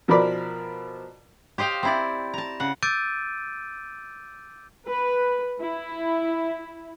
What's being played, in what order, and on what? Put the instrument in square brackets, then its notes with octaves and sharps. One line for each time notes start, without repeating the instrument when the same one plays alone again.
[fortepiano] B2 F3 A#4 B4 D5 B5
[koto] G4 C5 D#5 F5 G5
C4 E4 D5
A5 A#5
C#3 F#5
[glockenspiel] D6 E6 G6 A6 D7 D#7
[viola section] B4
E4